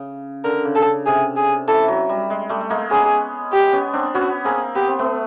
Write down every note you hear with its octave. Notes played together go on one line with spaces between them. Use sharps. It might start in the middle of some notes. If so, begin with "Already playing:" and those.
Already playing: C#3
D3 A#4
C#3
A4
C#3
C3 G#4
G#4
E3 A4
F#3
G3
G#3
G3 A3
A3
G#3 A#3
B3 C#4 G#4
G4
B3 C#4
C4 D4
B3 C#4 F#4
A#3 C4 G#4
B3 G4
C4
A3 B3